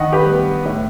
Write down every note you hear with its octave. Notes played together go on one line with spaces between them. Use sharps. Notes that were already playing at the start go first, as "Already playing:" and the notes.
Already playing: D#3 D#5 F#5
G4 B4
G3 B3
A2